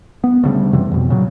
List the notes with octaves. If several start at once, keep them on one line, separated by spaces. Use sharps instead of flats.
B3
D2 C#3 G3
F#2 C3 E3
F2 B2
A#2 C#3 F#3